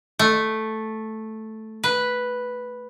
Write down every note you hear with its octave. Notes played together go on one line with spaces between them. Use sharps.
A3
B4